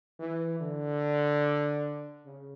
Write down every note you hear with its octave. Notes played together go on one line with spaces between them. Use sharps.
E3
D3
C#3